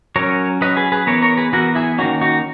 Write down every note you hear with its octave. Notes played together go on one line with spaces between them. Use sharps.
F#3 C#4 A#4 C#5
F#3 C#4 B4 D#5
G#4 B4
G#4 B4
E3 B3 A#4 C#5
A#4 C#5
G#4 B4
E3 B3 F#4 A#4
E4 G#4
D#3 A#3 C#4 D#4 F#4
D#4 F#4